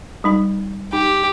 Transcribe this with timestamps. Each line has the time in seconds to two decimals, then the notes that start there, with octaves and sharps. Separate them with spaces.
0.24 G3 D#4 B5
0.93 D#4 G4